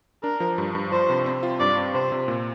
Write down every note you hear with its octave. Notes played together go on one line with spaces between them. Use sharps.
D4 A#4
F3
G2
G2
F3 C5
C3
C4
F4
G2 D5
C4
C3 C5
C3
A#2